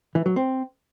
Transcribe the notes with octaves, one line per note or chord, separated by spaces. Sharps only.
E3
F#3
C4